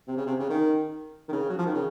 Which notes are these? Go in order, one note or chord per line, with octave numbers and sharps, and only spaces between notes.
C3
C#3
C3
C#3
D#3
D#3
C#3
F#3
F3
D#3
C#3